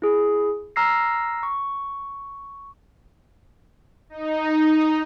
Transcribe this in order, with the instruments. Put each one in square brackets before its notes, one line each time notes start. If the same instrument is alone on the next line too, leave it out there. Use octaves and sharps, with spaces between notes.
[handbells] E4 G#4
A#5 E6 F6 A#6 C7
C#6
[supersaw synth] D#4